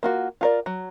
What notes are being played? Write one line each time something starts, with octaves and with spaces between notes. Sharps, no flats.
A#3 F4 F#4
F4 A#4 D5
F#3